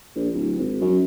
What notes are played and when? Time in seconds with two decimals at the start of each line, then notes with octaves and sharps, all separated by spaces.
0.15 A#1
0.34 D1
0.58 G#1
0.81 F#2